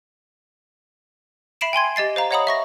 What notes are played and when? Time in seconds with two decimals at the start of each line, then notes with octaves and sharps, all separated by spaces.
1.61 E5 B5 C7 D7 E7
1.73 G5 G#5 C6 G#6
1.96 G4 D#5 A6 C7
2.16 C5 F5 A#5
2.31 C#5 D#5 F#5 A#5 B5 D#6
2.47 E5 C#6 A#6